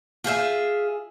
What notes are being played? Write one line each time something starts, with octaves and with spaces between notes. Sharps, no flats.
F4 G#4 C5 E5